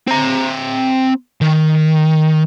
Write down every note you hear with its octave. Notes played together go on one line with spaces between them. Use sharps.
C4 A#5
D#3